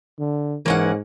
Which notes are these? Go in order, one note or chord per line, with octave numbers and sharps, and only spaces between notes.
D3
G#2 E3 A#3 C#4 F#5